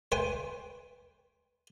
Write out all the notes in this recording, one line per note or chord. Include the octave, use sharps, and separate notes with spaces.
B4 C5 G5 G#5